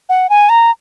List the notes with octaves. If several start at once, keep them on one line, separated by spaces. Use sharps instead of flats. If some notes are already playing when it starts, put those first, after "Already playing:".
F#5
G#5
A#5